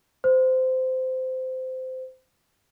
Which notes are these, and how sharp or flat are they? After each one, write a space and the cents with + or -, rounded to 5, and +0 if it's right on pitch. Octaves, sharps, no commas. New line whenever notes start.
C5 -20